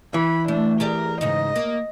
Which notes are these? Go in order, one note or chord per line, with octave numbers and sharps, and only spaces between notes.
E3 B5
A3 D4
G4 G#4 A#4 D5
G#2 C#3 D#4 D#5
A#3